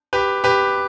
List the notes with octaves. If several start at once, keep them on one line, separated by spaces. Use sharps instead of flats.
G4 B4
G4 B4